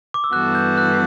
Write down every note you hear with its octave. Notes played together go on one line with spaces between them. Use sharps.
D6
E6
G2 E3 B3 F#4 A4 F#6
G6
F#6